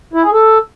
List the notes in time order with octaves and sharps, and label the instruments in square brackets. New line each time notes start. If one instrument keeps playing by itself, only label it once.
[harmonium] E4
G#4
A4